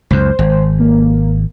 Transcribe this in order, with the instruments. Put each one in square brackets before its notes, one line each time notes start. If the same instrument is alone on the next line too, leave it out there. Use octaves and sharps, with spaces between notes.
[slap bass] C#2 F#2 [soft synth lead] C5
[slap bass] G#1
[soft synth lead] A#3